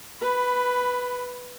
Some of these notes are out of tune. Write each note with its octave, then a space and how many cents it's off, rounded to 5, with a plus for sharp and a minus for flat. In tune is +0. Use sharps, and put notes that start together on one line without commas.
B4 +0 B5 +20